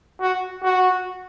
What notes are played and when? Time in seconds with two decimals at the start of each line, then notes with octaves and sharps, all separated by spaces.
0.21 F#4
0.63 F#4